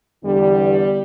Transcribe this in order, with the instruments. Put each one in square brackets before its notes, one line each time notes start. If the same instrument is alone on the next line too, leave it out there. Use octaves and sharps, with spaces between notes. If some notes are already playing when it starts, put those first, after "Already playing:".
[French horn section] E2 D3 G3